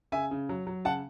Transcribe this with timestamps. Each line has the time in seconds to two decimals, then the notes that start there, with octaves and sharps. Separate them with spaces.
0.12 C#3 E5 G#5
0.31 C#3
0.49 F#3
0.67 F#3
0.85 C#3 F#5 A5